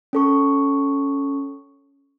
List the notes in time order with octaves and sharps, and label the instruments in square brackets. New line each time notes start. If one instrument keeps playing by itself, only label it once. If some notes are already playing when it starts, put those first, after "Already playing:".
[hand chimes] C#4 A4 C#6